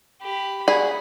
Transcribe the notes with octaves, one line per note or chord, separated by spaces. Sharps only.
G4 B5
F#4 G#4 D5 B5